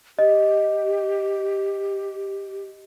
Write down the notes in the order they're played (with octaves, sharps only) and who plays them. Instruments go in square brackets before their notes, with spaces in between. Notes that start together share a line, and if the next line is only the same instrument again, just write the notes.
[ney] G4 [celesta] D#5